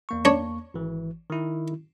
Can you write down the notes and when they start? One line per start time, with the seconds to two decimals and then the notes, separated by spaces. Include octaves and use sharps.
0.09 E2 A#3 C#6
0.25 D4 C#5
0.74 G#1 E3
1.30 D#3 E4